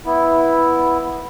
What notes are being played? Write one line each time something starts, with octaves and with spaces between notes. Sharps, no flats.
B3 E4